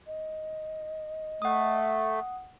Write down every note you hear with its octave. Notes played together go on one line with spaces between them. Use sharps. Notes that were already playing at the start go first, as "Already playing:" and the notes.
D#5
A3 F#5 D#6